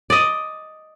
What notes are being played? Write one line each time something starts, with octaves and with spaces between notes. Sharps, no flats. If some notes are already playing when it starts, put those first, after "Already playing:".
D5 D#5